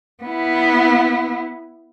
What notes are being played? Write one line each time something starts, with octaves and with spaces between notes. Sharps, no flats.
B3 E4